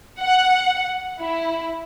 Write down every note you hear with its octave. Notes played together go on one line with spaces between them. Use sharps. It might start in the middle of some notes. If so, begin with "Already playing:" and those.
F#5
E4